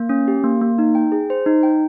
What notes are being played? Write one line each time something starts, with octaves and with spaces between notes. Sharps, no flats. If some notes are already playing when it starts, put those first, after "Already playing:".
Already playing: A#3
C#4
G4
A#3
A#3
D#4
G5
G#4
C5
D#4
G5